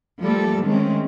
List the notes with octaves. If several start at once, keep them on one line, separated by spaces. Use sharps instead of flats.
F3 G3 A3 A#3 A4
D#3 G#3 A3 C4 C#4